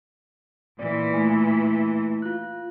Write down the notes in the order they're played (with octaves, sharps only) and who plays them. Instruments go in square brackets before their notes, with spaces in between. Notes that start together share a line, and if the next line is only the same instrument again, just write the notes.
[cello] A#2 E3 [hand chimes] D5
[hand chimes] A3 E4 G#5
F4 F#6